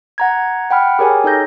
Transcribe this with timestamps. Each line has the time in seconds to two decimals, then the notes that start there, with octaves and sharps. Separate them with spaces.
0.18 F#5 A#5 G#6
0.70 F#5 G5 B5 F6
0.99 G4 G#4 A#4 C#5 G5 G#5
1.24 D#4 G#4 A4 C#5 G6 A#6